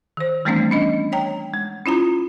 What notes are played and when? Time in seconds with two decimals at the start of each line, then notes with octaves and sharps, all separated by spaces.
0.17 D#3 C5
0.45 E3 G3 A3 B3 C4 D4
0.71 C#4 D4 D#5
1.12 C#5 G5 A#5
1.54 G#3
1.86 C#4 E4 F4 A#5